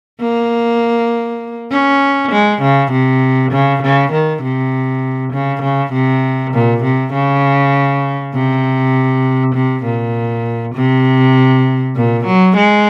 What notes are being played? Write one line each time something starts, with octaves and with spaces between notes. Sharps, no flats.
A#3
C#4
G#3
C#3
C3
C#3
C#3
D#3
C3
C#3
C#3
C3
A#2
C3
C#3
C3
C3
A#2
C3
A#2
F#3
G#3